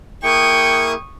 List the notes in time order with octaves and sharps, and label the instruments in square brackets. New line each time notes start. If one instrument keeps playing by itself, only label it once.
[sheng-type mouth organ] A#3 E4 G#4 [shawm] G5 [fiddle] C#6 D#6 [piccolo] C#7